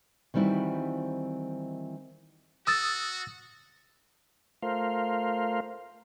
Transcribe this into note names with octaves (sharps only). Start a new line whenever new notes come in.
D#3 E3 G3 C4 E4 F#4
F#4 D#6 E6 A6
A3 F4 A#4 C5 F5